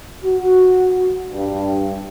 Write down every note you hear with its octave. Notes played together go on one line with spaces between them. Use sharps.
F#4
G2